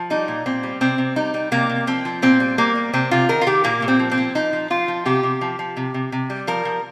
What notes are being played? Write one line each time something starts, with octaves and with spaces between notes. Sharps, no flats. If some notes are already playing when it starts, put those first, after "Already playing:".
Already playing: F3
G3 D#4
A#2
A#2 C4
G3
C3 C4
C3
G3 D#4
G3
C3 A#3
C3
F3 C4
F3
A#2 C4
G3
G3 A#3
G3
C3 C4
C3 F4
D#3 A#4
F4
D#3 G4
A#2 A#3
A#2
C4
F3
C4
F3
F3 D#4
F3
F3 F4
F3
C3 G4
C3
F3
F3
C3
C3
C3
G3
F3 A#4
F3